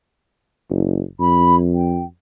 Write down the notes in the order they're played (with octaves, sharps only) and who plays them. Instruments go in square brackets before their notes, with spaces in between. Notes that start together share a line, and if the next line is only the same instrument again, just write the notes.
[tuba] F#1
[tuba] F2 [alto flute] B5
[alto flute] G5